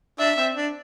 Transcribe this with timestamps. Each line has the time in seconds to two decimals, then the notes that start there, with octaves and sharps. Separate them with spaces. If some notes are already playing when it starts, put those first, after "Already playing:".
0.19 D4 E5
0.37 C4
0.55 D4